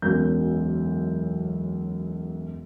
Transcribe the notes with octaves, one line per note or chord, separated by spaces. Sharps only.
E1 B1 F#2 G6